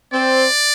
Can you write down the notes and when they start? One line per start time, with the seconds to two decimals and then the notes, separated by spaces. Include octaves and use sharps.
0.13 C4 D5